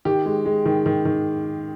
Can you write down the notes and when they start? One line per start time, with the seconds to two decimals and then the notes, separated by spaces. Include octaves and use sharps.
0.05 D#3 G4
0.26 G#3
0.46 G#3
0.65 D#3
0.86 D#3
1.05 D#3